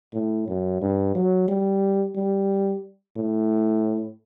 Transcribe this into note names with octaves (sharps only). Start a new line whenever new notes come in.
A2
F#2
G2
F#3
G3
G3
A2